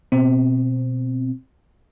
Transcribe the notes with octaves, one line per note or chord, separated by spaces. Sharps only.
B2 C4